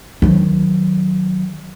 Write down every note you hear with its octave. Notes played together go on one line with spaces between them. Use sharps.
D#3 F#3